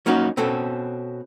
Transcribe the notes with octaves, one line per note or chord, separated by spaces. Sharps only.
F#3 A#3 C#4 D#4 F#4
B2 C4 C#4 A4